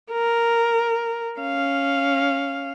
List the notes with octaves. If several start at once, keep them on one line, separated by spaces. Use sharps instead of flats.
A#4
C#4 F5